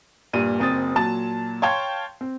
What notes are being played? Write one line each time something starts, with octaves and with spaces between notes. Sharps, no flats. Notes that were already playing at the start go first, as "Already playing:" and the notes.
A#1 G2 A#2 D#7
F#1 C4 D#6 A6
A#2 F#3 A5 A6
C#5 F5 G5 A5 C6
C4